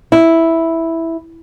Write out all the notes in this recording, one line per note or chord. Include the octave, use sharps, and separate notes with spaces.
E4